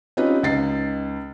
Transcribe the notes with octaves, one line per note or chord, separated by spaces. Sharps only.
C4 C#4 D#4 F4 G4 B4
C#2 D#4 A6 C7